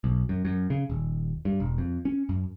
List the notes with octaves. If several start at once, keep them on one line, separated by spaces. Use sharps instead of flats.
B1
F#2
F#2
C#3
D#1
G2
E1
F2
C#4
F#2